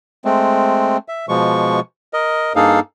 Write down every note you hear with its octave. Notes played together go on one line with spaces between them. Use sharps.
G#3 A3 C4
E5
B2 F3 G#3 C#6
A#4 D#5
G2 A#3 D#4 G#4 A4 F5